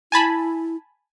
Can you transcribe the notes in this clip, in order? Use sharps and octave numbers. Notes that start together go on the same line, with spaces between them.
E4 G#5 A5 B5